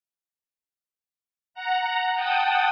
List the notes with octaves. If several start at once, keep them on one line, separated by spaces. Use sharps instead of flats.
F#5 A#5
F#5 G5 A5 D#6